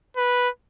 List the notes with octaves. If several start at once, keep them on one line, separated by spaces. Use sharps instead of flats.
B4